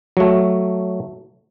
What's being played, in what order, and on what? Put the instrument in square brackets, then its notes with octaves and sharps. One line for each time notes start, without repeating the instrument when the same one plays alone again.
[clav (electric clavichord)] F#3 A3